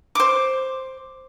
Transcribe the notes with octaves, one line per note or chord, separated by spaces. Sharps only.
C5 D6